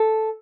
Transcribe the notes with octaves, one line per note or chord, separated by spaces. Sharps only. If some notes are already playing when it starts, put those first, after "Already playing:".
Already playing: A4